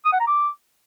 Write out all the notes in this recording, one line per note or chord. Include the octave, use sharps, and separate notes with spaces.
D#6
F#5
A#5
D6